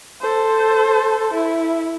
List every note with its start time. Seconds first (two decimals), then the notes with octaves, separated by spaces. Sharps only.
0.21 A4 C5
1.34 E4